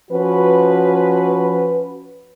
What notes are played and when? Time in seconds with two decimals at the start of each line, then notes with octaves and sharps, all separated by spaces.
0.11 F3 C#4 F#4 B4